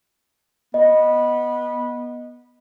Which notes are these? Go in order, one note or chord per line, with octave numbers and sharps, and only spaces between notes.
B3 D#5